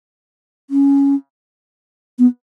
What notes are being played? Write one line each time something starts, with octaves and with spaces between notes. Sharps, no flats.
C#4
B3